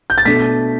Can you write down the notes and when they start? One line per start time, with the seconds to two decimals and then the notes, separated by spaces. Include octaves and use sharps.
0.10 G6
0.18 A6
0.25 B2 A3 D4 B6